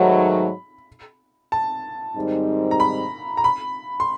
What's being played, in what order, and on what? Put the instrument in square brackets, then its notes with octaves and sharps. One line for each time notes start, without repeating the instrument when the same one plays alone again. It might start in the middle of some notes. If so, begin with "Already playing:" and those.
Already playing: [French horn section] G#2 D#3 F#3 A3 [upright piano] B5
[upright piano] A5
[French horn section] G#2 D#3 G3 C4 D#4
[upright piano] A#5
B5
A#5
B5
C6